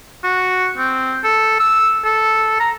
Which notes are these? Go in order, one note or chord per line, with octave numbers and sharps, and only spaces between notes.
F#4
C4
A4
E6
A4
A#5